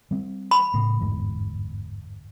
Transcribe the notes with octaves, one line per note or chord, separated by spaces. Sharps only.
G3 C4
B5
A2 C#3
G1 E2 G#2